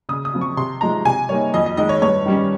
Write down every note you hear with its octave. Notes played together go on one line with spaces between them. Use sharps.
C#3 D#6
D#6
F3 C4 F4
C#6
C3 C6
F3 G#3 D#4 A#5
C3 G#5
G3 A#3 D#4 C#5
F2 D#5
D#5
D#3 G#3 D#4 D#5
C#5
G2 C#5
D#3 G3 C#4